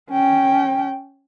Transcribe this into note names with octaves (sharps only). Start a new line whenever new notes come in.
C#4 G5